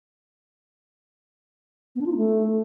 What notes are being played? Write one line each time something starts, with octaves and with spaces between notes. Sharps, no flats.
B3
D4
F4
D#4
A3